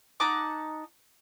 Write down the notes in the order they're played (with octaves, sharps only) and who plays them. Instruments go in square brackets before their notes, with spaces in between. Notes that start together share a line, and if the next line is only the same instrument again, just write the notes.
[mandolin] D#4 F#5 A5 D6